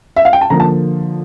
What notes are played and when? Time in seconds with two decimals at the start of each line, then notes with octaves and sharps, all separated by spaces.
0.16 E5
0.25 F5
0.33 G5
0.41 A5
0.50 D3 F3 A#3 A#5
0.60 A5